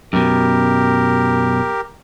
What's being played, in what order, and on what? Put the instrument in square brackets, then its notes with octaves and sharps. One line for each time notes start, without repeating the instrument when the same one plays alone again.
[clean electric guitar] F#2 B2 [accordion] G4 A#4